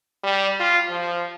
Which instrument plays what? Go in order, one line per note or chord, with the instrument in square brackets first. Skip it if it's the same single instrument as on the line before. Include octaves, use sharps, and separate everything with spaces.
[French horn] G3
F4
F3